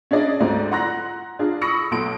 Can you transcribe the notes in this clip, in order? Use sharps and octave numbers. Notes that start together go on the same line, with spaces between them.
C#4 D4 G#4 D5 D#5
D2 G#2 C4 D5 A#5
F#5 A#5 C6 F#6 A#6
D4 F4 G#4
B5 C#6 D#6 E6 A#6 C#7
B1 B2 A4 C6 D7